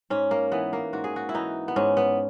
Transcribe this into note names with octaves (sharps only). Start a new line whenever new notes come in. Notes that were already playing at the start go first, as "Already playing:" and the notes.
G#2 C#4
A#3
E3 B3
A#3
G#2 F#4
G#4
F#4
E4
E3 D#4
B3
G#2 C#4
B3